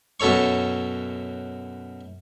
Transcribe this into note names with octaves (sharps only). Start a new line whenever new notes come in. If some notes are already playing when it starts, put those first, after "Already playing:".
F#2 B2 A4 C#5 C#6